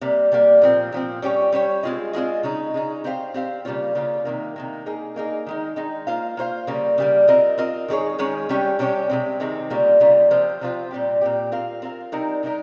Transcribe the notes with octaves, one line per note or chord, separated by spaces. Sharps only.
C3 G3 A#3
C3 G3 A#3
A#2 F3 C4
A#2 F3 C4
G3 C#4 G4 C#5
G3 C#4 G4 C#5
G#3 C4 F4 G#4 D#5
G#3 C4 F4 G#4 D#5
C#3 G#3 D#4
C#3 G#3 D#4
C4 G4 C5 F5
C4 G4 C5 F5
C#3 G3 A#3 C#4 F4
C#3 G3 A#3 C#4 F4
C3 D#3 A#3
C3 D#3 A#3
A#3 D#4 G#4
A#3 D#4 G#4
D#3 G#3 D#4
D#3 G#3 D#4
A#3 F4 C5 F5
A#3 F4 C5 F5
C#3 G3 A#3
C#3 G3 A#3
C4 F4 A#4 D#5
C4 F4 A#4 D#5
D#3 G#3 C#4 G#4 C#5
D#3 G#3 C#4 G#4 C#5
C3 G3 C#4 G4 C#5
C3 G3 C#4 G4 C#5
C3 D#3 G#3 C4
C3 D#3 G#3 C4
C#3 G3 A#3 F4
C#3 G3 A#3 F4
C3 F3 C4 F4 C5
C3 F3 C4 F4 C5
A#2 G3 C4 G4
A#2 G3 C4 G4
C4 F4 A#4 F5
C4 F4 A#4 F5
C3 G3 C4 D#4 A#4
C3 G3 C4 D#4 A#4